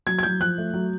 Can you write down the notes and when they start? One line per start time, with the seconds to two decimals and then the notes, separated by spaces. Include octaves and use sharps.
0.07 F#3 G#6
0.19 G#6
0.23 F#3 G6
0.40 F3 F#6
0.58 A3
0.74 F#3